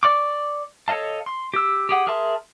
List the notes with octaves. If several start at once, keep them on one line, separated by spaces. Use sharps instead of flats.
D5 C#6 D6
A4 C#5 D#5 F5 A5
C6
G4 E6
G4 G#4 F#5
G#4 A#4 E5 A5 C6